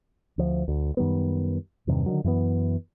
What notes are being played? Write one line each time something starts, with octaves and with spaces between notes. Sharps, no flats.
D2 F3
D2
F#2 D#3 G3 B3
E2 G2 C3 D#3
D3 D#3 F#3
F#2 E3 A3 B3